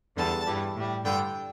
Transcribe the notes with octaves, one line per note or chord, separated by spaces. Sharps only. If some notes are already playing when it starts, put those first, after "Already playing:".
E2 D3 G3 A5
G2 E3 G3
A2 G3
G2 D3 G3 G5